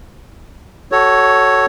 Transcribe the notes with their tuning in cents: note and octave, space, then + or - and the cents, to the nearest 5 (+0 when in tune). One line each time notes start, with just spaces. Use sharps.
F#4 +25 A4 +0 C#5 +0